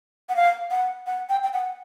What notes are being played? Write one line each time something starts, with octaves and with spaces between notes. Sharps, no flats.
F#5
F5
F#5
F#5
G5
G5
F#5